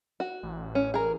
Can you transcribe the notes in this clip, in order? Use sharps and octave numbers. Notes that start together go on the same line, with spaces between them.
F#4
A1
C#4
G#4 A#4